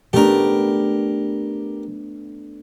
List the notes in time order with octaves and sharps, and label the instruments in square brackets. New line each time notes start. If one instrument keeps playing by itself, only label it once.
[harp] A3 B3 D4 [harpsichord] G4 A#4